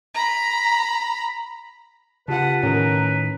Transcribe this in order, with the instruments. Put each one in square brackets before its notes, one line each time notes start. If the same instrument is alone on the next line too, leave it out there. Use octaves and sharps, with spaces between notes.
[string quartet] A#5 B5
[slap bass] C#3 [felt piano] F4 G4 [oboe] B4 [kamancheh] F#5 A5
[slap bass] A2 D#3 [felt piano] C#4 [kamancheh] A#4